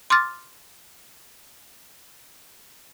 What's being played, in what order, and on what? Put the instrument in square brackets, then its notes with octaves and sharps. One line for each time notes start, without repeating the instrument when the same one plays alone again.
[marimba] C6 D6 F6 A6